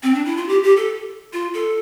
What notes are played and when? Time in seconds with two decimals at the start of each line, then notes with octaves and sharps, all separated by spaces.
0.03 C4
0.14 D4
0.25 E4
0.37 F4
0.48 G4
0.63 G4
0.77 A4
1.33 F4
1.54 A4